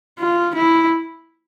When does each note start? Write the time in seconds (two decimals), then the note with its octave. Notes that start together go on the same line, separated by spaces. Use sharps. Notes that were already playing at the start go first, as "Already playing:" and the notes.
0.19 F4
0.55 E4